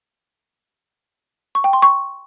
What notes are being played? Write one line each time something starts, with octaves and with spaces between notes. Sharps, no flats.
C#6
G5
C6
C#6